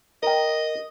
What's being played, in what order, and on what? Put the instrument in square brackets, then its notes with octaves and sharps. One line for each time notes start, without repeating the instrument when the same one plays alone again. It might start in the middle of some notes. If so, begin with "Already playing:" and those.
[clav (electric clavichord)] A#4 G5 [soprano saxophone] D#5